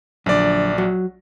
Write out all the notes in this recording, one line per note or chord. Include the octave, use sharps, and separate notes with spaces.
A#1 F#2 D3 D5
F#3